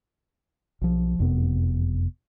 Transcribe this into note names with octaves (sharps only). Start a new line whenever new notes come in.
B1 F3
F#1 F2 C3 B3